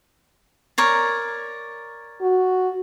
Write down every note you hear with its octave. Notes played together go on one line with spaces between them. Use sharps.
A#4 C#5 D5
F#4